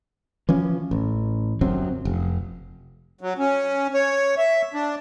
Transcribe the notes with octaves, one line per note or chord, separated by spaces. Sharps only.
E3 F3 C#4
A1
G1 F#2 F#3 C4
F1
F#3
C#4
C#5
E5
D4